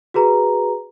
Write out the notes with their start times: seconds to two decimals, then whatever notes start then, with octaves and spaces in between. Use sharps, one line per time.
0.14 F#4 G#4 B4 A#5